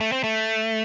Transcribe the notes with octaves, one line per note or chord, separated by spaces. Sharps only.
A3
C4
A3